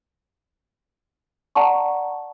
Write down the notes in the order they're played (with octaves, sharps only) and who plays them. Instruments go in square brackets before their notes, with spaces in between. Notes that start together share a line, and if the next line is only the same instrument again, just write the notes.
[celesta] D5 F#5 A5 A#5 C#6